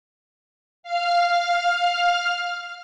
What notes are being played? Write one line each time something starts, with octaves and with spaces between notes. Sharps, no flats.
F5 F6